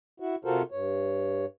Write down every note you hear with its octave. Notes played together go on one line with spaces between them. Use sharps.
E4 F#4
C3 F4 F#4 A4 A#4 C5
G2 C#5